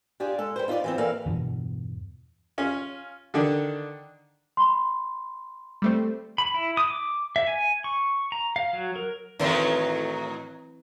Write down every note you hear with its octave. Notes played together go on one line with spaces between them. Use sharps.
D4 F4 G4 G#4 D5
G#3 A4
G3 B4 C5
D#4 F4 B4 D5
E3 F3 C4
E3 A#3 A4 B4 D5 F5
E2 G2 B2 E3
C#4 F4
D3 D#3 D4
B5 C6
G3 A3 C4
B5
E4
D#6
D6
E5
G#5
C#6
A#5
F5
F#3
A#4
A2 D#3 E3 F#3 C4 C6